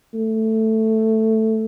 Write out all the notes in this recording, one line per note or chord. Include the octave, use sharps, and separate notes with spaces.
A3